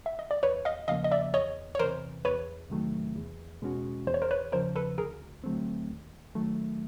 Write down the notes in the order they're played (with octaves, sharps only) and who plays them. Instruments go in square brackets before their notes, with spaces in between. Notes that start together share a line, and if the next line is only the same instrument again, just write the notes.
[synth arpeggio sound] E5
D#5
D5
[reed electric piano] E2 [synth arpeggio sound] B4 C#5
[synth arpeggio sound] D#5 F5
[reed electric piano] C#3 F3 A#3 [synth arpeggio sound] D#5 F5
[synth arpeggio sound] D#5
D5 E5
[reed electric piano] E2 [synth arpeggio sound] C#5 D#5
[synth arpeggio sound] C#5
[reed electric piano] C3 E3 [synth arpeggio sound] A#4 C5
[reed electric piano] E2 [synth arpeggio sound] B4 C#5
[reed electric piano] C3 D#3 F#3 A3
E2
B2 G#3 C#4 F#4
[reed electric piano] E2 [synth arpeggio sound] C5
[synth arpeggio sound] C#5
A#4 C5
B4 C#5
[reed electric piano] C#3 F3 [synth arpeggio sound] A#4 C5
[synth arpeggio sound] A4 B4
[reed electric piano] D2 [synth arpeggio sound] G#4 A#4
[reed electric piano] D3 F#3 A3 C4
D#2
D#3 F#3 A3